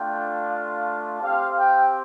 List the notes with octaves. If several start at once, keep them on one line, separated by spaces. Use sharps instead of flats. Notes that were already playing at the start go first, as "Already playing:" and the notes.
Already playing: A3 D4 F4 G5
F5
C4 G4 F5
G5